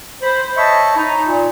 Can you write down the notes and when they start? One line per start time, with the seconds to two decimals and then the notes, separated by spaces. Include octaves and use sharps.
0.23 C5 B5
0.57 C#5 D#5 E5 A5 B5 C#6
0.96 D#4
1.26 A#2